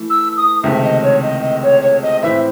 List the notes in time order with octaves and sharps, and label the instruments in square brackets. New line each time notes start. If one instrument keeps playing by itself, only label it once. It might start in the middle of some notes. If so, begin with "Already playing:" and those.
Already playing: [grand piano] E3 A3
[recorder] E6
D#6
[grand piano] C#2 C3 D#3 A3 D#4 [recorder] E5
[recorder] D#5
C#5
D#5
D#5
C#5
C#5
D#5
[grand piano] A2 E3 C4 [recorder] E5